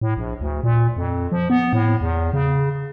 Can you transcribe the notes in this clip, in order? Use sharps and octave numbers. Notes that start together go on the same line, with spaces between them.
A2
A#1
D2
A#2
F2
F3
B3
A2
E2
C#3